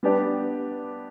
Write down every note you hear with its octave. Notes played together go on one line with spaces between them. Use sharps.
G3 B3 D4 G4 D5